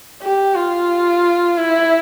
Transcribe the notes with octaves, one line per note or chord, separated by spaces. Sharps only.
G4
F4
E4